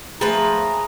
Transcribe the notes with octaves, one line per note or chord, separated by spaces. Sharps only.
F3 A3 G#4 B4 A#5